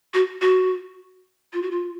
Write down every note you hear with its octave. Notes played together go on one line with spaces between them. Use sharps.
F#4
F#4
F4
F#4
F4